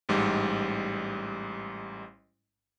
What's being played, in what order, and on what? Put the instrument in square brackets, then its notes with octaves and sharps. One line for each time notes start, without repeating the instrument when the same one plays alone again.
[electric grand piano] A1 G#2 G3